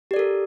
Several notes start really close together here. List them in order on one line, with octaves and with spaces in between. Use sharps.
G4 D5 A4 A#4